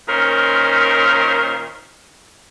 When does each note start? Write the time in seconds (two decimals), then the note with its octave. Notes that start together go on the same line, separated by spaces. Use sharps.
0.09 A#2 D#3 C#4 A#4 C5